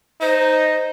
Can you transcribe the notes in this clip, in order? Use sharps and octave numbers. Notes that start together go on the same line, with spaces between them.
D#4 C5